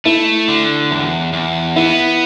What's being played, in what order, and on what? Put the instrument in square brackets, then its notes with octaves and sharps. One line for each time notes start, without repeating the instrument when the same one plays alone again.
[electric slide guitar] A3 [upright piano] E4
[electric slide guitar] D3
E2
E2
[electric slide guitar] B3 [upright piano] E4